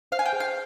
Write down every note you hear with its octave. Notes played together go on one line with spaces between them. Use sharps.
C5 F5
G#5
G5
G#4
F5